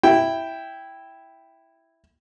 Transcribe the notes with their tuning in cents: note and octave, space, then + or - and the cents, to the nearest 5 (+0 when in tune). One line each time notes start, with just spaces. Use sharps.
E4 +0 G5 +0